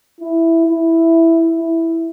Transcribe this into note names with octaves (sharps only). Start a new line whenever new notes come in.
E4
E4
E4